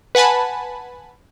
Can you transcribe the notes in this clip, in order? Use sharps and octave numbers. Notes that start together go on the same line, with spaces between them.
B4 F#5 G#5 A5 B5